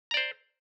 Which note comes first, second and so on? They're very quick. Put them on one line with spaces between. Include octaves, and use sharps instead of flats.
A#5 D5 C5